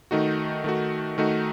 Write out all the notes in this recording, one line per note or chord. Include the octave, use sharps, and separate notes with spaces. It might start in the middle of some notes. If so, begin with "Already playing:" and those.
D#3 A3 D#4 F#4
D#3 A3 D#4 F#4
D#3 A3 D#4 F#4